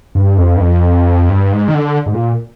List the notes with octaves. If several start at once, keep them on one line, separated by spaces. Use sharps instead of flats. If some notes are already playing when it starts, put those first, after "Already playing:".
G2
F2
G2
F2
G2
G#2
D#3
D3
G#2
A#2